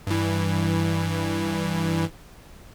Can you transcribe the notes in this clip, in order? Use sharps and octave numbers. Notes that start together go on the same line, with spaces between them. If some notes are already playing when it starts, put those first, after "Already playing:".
G2 E3